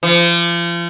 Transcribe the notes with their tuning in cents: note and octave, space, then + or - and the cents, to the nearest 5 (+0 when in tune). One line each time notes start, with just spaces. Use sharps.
F3 -35